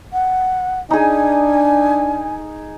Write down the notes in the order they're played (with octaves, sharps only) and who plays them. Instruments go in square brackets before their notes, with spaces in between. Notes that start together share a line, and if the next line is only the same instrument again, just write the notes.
[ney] F#5
[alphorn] D4 [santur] D#4 G#4 [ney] G#5